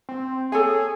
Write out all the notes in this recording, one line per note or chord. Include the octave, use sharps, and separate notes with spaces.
C4
G#4 A4 C#5 G#5